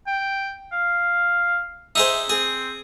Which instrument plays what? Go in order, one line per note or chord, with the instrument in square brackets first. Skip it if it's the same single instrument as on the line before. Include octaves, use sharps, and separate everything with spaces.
[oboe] G5
F5
[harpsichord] D#4 G#4 C5 [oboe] E5
[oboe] C4 [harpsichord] G#4